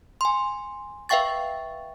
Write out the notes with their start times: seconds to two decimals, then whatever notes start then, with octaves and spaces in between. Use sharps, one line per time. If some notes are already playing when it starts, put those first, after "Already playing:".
0.21 G#5 C6
1.09 B4 E5 F5 G5 C#6 A6